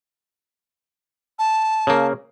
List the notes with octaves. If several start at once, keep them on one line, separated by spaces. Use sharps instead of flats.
A5
C#3 A#3